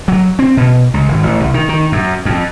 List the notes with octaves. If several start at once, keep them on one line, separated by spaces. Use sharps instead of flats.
F#3
C4
B2
C#2
G#1
A1
C2
D#3
D#3
F#2
F2